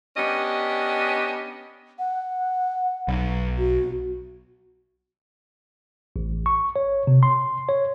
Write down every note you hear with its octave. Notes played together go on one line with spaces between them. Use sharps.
B3 C#4 D4 G4 D#5
F#5
B1
F#4
A1
C#6
C#5
C3
C6
C#5